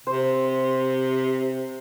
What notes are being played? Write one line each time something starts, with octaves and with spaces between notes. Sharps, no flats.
C3 C5